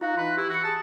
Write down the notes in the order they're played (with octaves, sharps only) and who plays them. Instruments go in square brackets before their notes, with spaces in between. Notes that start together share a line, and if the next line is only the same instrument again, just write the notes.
[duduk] D#4 [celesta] F4 F5 F#6 [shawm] F#4
[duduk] E3 [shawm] B4 [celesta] C6
[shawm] E4 [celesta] G4
[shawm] F#4 [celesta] F#6 C#7
[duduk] G#4 [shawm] A5